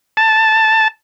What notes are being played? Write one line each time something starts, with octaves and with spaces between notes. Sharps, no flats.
A5